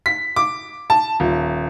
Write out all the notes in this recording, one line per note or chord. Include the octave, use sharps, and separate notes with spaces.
B6
D6
A5
D#1